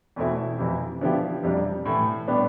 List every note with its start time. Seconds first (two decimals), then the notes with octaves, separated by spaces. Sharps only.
0.16 E2 B2 A3 C4 E4
0.58 F2 C3 E3
1.01 D3 F3 B3 E4 G4
1.43 F2 C3 G3 D4
1.85 A2 E3 A3
2.27 A2 G3 B3 D4 G4